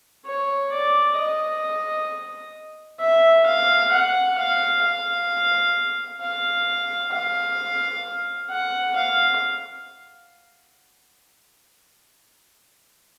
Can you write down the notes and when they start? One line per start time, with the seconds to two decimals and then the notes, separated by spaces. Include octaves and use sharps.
0.26 C#5
0.72 D5
1.17 D#5
3.00 E5
3.46 F5
3.92 F#5
4.38 F5
4.83 F5
6.21 F5
7.13 F5
8.50 F#5
8.96 F5